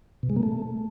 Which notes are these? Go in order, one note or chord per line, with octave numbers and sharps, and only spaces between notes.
B2
G#3
A#3
A3